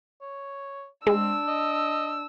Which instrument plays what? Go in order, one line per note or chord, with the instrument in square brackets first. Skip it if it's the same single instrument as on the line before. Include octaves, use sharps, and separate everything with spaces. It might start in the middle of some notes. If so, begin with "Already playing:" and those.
[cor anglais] C#5
[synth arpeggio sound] G#3 [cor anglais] C4 [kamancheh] D4 E6
[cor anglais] D#5